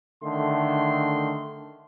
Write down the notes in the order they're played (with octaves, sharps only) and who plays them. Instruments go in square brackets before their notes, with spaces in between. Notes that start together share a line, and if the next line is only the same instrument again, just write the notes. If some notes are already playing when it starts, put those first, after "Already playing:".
[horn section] D3 D#3 A3 C6